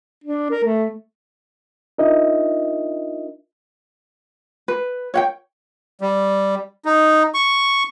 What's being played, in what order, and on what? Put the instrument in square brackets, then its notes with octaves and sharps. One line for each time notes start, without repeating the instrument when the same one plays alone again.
[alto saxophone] D4
A#4
A3
[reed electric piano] D4 D#4 F4 A#4 D#5 E5
[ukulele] B4
C#5 F#5 G5
[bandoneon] G3
D#4
C#6